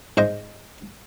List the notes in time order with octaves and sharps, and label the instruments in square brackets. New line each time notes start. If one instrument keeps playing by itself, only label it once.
[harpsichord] G#2 C5 D#5